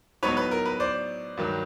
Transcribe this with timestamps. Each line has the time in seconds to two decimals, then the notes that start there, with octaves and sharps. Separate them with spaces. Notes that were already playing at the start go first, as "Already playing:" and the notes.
0.23 A2 F#3 B3 D#4 B4 C#5
0.37 B4
0.51 A#4
0.66 B4
0.80 C5 D5
1.37 G2 D#3 F#3